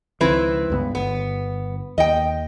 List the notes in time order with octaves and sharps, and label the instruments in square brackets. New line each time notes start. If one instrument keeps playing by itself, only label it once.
[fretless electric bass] C#2 D#3 F3 [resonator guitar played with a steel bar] C4 E4 B4
[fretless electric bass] C#2 G2 B3
[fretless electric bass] G1 [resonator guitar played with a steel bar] B3
[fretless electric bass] D#2 [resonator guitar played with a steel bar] D#5 G5